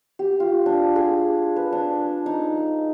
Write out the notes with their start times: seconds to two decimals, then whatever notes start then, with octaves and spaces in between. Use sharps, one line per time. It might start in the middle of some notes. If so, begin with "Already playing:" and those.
0.19 G4
0.40 F4
0.66 D4
0.96 G#4
1.56 B4
1.73 D4
2.26 D#4